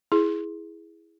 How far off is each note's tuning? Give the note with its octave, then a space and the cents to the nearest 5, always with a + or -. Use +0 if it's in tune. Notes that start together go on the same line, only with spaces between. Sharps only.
E4 +0 G#4 +0